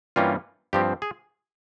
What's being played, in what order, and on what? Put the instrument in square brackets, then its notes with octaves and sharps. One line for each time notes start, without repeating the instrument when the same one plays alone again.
[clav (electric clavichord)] G2 E3 G3 A#3 C#4 F4
G2 F3 C4 G4
G#4